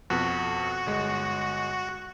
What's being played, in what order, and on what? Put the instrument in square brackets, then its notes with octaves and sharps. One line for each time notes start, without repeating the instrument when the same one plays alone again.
[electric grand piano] F2 B2 A4 [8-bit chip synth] F#4
[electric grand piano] G1 G#3